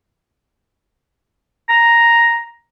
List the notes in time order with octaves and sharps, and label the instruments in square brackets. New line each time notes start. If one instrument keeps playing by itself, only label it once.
[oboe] A#5